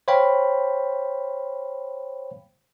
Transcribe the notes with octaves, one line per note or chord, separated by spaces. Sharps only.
C5 C#5 F5 G5 B5